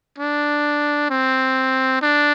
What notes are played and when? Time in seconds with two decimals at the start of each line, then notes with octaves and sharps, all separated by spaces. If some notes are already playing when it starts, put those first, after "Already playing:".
0.19 D4
1.10 C4
2.02 D4